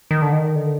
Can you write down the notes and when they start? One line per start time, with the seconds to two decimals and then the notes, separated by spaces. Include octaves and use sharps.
0.11 D#3
0.22 D3
0.33 D#3
0.56 D3